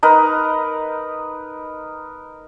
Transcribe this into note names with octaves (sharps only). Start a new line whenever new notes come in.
D#4 A#4 B4 D#5